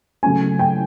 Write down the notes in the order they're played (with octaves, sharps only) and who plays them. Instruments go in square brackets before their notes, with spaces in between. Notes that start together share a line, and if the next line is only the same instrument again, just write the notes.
[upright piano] C#3 F#3 A3 C#4 G#5
G5